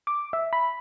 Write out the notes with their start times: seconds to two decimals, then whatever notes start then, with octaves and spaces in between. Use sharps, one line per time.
0.07 D6
0.33 E5
0.53 B5